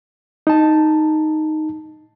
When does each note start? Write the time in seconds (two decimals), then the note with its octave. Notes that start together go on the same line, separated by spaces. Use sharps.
0.47 D#4 A5